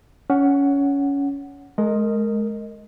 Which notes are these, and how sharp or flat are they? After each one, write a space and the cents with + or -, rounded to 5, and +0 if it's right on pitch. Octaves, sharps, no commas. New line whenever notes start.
C#4 +15 F#5 +0
G#3 +30 A#4 -15 D#5 +0